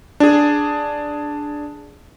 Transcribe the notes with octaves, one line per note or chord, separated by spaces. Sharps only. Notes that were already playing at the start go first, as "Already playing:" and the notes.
D4 G#4